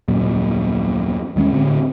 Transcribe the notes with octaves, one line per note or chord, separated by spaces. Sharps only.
D#1 F#2 A#2
D#2 D#3 G#3 C#4
A2 D3 C4